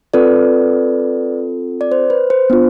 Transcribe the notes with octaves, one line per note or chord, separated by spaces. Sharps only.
C4 F4 A4 B4 D5
D5
C5
B4
C5
B3 D4 F4